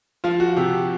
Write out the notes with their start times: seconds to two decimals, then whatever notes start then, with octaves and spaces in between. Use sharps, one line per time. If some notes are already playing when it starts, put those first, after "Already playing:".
0.24 F3 F4
0.40 F#4
0.57 C3 G4